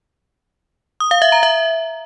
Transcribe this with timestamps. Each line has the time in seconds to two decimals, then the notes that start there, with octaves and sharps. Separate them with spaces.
1.00 D#6
1.11 F5
1.22 E5
1.32 A#5
1.43 E5